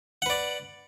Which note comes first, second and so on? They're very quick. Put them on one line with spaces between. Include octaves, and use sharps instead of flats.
F#5 B4 D5